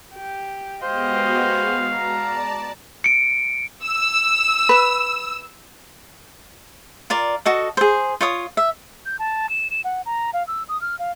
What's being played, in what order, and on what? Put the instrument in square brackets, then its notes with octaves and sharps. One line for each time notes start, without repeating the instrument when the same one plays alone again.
[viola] G4
[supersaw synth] G#3 B3 F#4 [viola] G4 D#5 [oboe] C5 [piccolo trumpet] F5
[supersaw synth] D5 A5 [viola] A#5
[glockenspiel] C#7 D7
[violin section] E6
[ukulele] B4
[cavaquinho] F4 A#4 D5
F#4 A4 D#5
G#4 C5
F4 C#5 D#6
E5
[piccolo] G6
A5
E7
E7
F#5
A#5
F5
E6
D#6
F6
F5